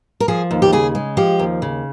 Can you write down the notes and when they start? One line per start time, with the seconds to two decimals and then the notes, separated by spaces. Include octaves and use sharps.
0.20 A#4
0.28 F3 G#4
0.51 D#2
0.62 G4
0.73 C#3 G#4
0.95 G#3
1.17 F3 G4
1.39 D#2
1.62 C#3